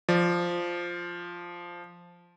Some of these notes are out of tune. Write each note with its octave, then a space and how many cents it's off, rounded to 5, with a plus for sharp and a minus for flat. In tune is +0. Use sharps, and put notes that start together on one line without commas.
F3 +0 D5 +15